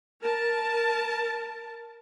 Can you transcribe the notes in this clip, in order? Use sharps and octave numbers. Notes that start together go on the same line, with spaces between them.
A#4 A5